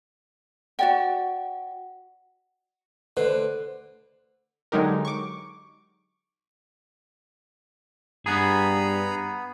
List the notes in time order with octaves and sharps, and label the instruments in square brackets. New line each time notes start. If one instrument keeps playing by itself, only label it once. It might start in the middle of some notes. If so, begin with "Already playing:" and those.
[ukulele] F#4 D5 G5 [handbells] F#5
[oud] D2 B4 C5 [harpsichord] D3
[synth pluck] D3 F#3 G#3 D#4 G4 A#4
C#6 D6
[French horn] G2 [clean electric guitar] B3 G#4 [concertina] A#5 B5